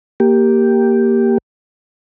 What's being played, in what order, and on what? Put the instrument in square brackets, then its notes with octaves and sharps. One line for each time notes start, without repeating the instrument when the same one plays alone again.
[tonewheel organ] A#3 G4